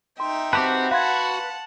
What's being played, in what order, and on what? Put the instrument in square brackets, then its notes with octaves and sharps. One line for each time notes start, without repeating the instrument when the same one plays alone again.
[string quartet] D#4 E5 G5 [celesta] C6
[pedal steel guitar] C4 G4 B4 [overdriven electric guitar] F#4 [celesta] A5 D6
[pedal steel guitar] B4 [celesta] F5 C6 G#6 [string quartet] F#5 A5